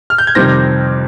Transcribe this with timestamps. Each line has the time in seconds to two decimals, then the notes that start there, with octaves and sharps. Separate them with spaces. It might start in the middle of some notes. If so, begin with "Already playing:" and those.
0.10 F6
0.18 G6
0.27 G#6
0.35 F2 C3 D#3 G3 C4 A#6